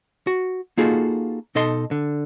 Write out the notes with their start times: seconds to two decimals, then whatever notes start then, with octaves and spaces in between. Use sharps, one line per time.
0.27 F#4
0.78 A#3 D#4 F4 F#4 G#4 A4
1.55 B2 D#4 A4 D#5 C6
1.91 D3